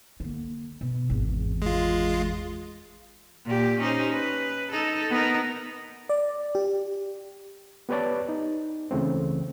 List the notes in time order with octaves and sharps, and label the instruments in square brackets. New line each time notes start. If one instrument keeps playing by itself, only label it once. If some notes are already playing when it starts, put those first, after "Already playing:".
[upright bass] D3 A#3
B2
G#1 E2
[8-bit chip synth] G#3 F4
[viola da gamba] A#2 G4
C#4 D#4 C5
B4
D#4 A4
B3 D#4 A#4
[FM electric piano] D5
G4
[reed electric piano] B3 G4 B4 C#5 D5 A5
D#4
C#2 C#3 E3 A3 C4